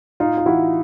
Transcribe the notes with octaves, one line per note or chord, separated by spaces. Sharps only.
A2 D#4 F4
F4
E3 E4 F#4